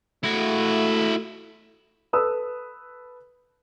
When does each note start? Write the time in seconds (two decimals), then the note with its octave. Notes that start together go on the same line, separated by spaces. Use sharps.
0.24 A3 E4 F#4
2.13 A4 B4 D#6 E6